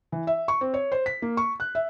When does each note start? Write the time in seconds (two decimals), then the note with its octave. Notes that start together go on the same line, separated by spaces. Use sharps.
0.12 E3
0.27 E5
0.48 C#6
0.61 C4
0.74 C#5
0.92 C5
1.06 B6
1.22 A#3
1.37 C#6
1.60 F#6
1.75 E5